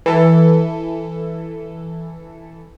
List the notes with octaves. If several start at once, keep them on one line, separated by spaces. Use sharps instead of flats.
E3 A4